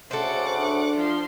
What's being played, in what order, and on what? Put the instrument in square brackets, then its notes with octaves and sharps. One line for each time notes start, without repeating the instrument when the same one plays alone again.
[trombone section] D2 C#3 A3 [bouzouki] A4 C5 [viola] F#5 D6
[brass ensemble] D4
[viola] F3 C6